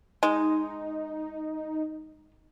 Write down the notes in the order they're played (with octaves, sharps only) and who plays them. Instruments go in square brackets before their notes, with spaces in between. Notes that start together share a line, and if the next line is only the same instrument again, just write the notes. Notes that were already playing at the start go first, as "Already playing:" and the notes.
[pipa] G#3 [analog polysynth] D#4